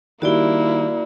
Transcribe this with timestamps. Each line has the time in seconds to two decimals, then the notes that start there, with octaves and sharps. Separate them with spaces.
0.22 D#3 G3 A#3 E4 F#4 D5 G7